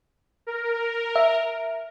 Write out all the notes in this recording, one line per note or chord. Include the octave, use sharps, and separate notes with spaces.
A#4
E5